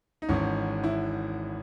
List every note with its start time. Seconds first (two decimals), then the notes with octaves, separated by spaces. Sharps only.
0.22 D#4
0.29 G#1 G#2 E3 C#4
0.84 E4